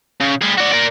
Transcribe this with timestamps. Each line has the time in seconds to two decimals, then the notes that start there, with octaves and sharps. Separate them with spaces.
0.20 C#3
0.41 G3 G#4
0.57 F#4 D5
0.71 A#4 D5